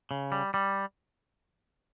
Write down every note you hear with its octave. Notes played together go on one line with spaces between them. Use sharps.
C#3
G3
G3